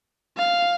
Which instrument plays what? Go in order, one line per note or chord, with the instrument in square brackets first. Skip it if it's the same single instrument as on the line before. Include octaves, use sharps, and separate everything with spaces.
[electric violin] F5